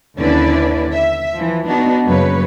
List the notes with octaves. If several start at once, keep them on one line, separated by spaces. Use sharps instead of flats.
D#2 D3 C#4 E4 B4 D5
E5
E3 F3
B3 D4 D#4 F#4
F#2 C#3 F#3 A#3 B4 C#5